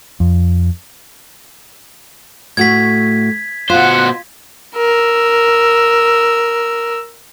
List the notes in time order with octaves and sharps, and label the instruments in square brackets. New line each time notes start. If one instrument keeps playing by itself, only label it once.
[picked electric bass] F2
[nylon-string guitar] A2 A3 F#4 [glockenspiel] G#6 B6
[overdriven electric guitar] B2 C5 [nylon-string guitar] F4 [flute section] F#5 F#6
[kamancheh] A#4 E6